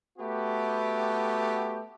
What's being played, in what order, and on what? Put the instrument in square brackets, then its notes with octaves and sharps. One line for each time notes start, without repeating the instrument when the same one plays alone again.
[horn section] A3 B3 F#4 G4